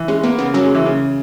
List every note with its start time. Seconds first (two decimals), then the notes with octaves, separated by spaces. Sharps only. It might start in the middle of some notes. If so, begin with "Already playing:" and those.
Already playing: E3
0.08 G#3 C#4
0.23 A#3 B3
0.38 C#3 B3
0.54 F#3 C#4
0.65 G#3
0.75 E3
0.86 C#3